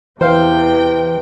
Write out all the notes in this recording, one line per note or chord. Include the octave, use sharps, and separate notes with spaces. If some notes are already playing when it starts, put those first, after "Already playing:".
E2 C3 E3 C5 F5 G5